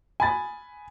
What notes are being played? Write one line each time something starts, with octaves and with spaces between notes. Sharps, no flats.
G#5 B5 A6